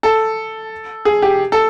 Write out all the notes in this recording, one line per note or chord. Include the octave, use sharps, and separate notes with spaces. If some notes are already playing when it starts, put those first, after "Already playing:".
A4
G#4
G4
A4